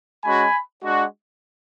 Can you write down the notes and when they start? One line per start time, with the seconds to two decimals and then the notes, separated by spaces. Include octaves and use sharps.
0.24 G#3 C#4 F#4 G#5 B5
0.84 G#3 D4 F#4